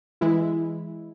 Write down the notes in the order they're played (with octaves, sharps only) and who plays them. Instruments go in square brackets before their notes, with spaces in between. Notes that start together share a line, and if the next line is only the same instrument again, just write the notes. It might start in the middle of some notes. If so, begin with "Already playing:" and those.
[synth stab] E3 G#3 E4